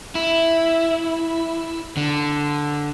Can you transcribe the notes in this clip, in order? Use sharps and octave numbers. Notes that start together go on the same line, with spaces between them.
E4
D3